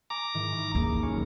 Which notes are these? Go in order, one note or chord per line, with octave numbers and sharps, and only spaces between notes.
G#5 A#5 C#6 D6
G#2 D#3 E3
G#1 C#6
D#2 D#4 G#4
B1 C#4